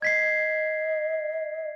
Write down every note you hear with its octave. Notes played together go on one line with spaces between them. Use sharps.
D#5 G#6 B6 C7